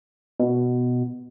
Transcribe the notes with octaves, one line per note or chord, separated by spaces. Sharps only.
B2